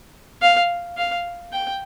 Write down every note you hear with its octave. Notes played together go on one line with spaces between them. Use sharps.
F5
F5
G5